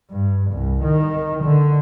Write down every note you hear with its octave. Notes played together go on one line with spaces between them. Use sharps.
G2
C2
D#3
D3